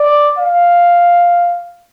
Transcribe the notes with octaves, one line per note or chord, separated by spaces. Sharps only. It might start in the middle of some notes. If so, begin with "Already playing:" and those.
Already playing: D5
F5